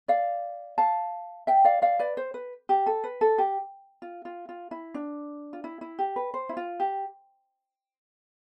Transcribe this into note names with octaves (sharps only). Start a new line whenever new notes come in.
D5 F5
F5 A5
E5 G5
D5 F5
D5 F5
B4 D5
C5
B4
G4
A4
B4
A4
G4
F4
F4
F4
E4
D4
F4
E4
E4
G4
B4
C5
E4
F4
G4